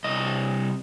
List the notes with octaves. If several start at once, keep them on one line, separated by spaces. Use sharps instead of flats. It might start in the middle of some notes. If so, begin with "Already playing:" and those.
C2 D#5